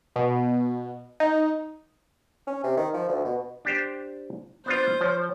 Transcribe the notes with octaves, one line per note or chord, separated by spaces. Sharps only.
B2
D#4
C#4
C3
D#3
F3
D2
B2
D4 G4 C5
B3 D4 F4 C5
F3 C#5